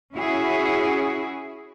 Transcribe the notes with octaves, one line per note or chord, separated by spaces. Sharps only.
C#4 E4 F#4 G#4